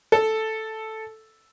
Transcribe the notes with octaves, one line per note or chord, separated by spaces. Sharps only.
A4